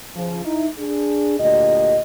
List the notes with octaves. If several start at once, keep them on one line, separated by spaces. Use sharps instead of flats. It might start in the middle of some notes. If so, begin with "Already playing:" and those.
C#3 F3
D#4 E4
D4 G#4
D2 A#2 G4 D#5